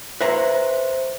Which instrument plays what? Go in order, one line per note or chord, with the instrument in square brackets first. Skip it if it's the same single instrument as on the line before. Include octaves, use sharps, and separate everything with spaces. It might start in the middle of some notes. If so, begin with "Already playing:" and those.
[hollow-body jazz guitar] B4 E5 A#5 [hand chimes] C5